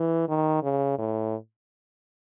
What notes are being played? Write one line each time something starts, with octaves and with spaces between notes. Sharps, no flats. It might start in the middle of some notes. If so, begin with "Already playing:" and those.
Already playing: E3
D#3
C#3
A2